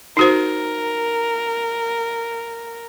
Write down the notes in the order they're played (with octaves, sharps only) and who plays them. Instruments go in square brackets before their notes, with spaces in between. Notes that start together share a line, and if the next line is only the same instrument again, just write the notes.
[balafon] D#4 F#4 C5 [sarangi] A#4